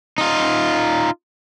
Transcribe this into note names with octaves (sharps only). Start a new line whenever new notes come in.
D#4 F4